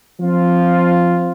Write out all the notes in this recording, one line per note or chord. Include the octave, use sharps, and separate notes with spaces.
F3 C4 F4